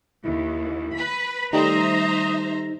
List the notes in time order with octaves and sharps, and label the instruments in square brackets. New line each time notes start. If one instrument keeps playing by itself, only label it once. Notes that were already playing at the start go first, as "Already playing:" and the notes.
[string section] D#2 [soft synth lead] E4
[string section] B4 B5
[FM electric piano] D#3 G3 A3 [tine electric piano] D#4 [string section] C5 E5 A#5 [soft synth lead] D#6